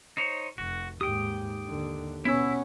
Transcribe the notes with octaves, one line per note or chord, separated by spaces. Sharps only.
D#4 C5 C#5
F1 F#4
D#2 G#2 G4 G5 D#6
D#2 D3
B2 B3 C#4 E4 E6